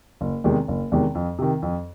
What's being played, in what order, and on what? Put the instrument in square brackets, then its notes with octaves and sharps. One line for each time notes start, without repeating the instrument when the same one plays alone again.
[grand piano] F#1
E2 C3 D#3 G#3
F#1
E2 C3 D#3 G#3
F2
C3 D#3
F2